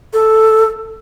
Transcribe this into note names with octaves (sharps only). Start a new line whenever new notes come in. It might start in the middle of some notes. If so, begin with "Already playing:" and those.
A4